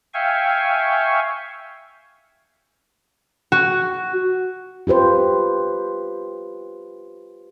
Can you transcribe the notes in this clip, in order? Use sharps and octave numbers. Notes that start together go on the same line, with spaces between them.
E5 F5 G5 G#5 C#6
F#4
F4 G4 B4 C5